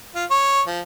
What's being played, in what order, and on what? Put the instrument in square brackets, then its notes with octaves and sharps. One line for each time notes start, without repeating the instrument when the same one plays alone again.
[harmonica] F4
C#5
F3